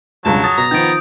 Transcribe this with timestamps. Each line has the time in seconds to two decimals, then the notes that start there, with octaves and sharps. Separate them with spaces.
0.25 E1 C#2 G2 F#3 A5
0.44 D#6 A6
0.58 B2 A#5
0.71 D#3 F3 B3 G6 D7